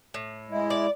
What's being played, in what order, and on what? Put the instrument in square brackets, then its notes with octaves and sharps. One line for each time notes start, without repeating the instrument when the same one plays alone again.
[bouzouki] A2
[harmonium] G#3 E4
[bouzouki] D5